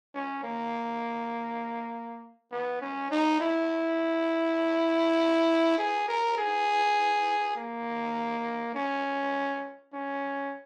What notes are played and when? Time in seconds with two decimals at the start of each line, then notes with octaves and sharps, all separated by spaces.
0.15 C#4
0.44 A#3
2.52 B3
2.82 C#4
3.11 D#4
3.40 E4
5.78 G#4
6.08 A#4
6.38 G#4
7.56 A#3
8.75 C#4
9.93 C#4